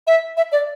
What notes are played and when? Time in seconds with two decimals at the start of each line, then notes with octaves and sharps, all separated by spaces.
0.07 E5
0.37 E5
0.52 D5